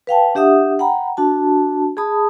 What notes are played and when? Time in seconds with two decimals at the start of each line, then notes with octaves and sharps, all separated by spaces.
0.07 B4 F5 G5 A5
0.35 D4 G4 E5 F#5 D#6
0.79 F#5 G5 A#5 B5
1.17 D4 F#4 A5
1.97 G#4 A5 B5 D#6